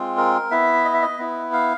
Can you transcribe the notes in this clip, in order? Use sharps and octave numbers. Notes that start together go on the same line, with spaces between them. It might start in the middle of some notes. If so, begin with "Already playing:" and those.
Already playing: G#3 C4 F4
A#4
B3 E4 E5
D#5
E5
D#5
B3 E4
F5